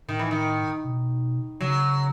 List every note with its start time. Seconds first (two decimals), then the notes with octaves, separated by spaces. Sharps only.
0.08 A2 D#3
0.19 E3
0.31 D#3
0.84 B2
1.60 C#3 F#3